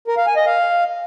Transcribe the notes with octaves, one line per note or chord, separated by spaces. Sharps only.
A#4
F5
G#5
D#5
F5